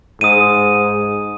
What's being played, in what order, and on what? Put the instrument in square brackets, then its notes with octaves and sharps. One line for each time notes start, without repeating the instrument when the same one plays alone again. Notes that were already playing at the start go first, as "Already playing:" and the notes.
[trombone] G#2 [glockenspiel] D#6 D#7